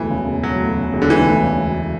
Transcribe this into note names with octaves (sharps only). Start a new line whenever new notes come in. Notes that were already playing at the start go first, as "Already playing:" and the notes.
Already playing: E1 D2 E3
C#3
E1
E1 F#3
D2
C#3
E1
D3
E1 E3
D2
C#3
E1